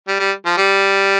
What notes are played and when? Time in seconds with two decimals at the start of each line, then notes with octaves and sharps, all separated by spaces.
0.08 G3
0.20 G3
0.45 F3
0.57 G3